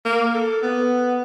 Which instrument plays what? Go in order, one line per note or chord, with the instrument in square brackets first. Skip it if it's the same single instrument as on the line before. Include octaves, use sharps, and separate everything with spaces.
[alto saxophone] A#3
A4
B3